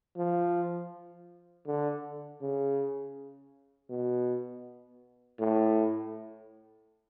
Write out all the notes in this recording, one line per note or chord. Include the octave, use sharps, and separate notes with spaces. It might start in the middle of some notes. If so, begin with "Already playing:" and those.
F3
D3
C#3
B2
A2